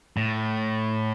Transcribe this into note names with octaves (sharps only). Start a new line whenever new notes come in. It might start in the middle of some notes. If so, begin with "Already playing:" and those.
A2